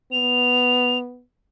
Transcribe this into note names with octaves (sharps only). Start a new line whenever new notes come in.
B3 F7